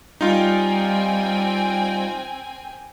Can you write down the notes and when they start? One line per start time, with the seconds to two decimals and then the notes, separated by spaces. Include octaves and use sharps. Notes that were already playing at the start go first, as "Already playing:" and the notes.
0.21 G3 C4 D#4 F4 G5 G#5